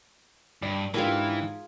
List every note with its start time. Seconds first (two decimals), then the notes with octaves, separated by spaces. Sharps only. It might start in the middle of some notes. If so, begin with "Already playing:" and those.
0.62 G2 D5
0.94 G#2 E3 D4 F4 G4 G#4 A#4 B5